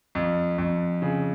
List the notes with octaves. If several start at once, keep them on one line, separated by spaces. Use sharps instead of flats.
F2
F2
C#3